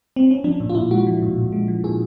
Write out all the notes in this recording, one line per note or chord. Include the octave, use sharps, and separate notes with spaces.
C4
C#4
F3 D4
A#2
F4
A#2 E4
G#3 F#4
F3
A#2
A#2
G#3
F3
A#2 G#4